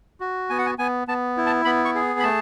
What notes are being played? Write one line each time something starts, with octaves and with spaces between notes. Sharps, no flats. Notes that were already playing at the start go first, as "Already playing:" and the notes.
F#4
B3 G#5
F#5
G#5
B3 G#5
B3 A5
E4
A5
B3 B5
C#6
G#4
B5
A3 A5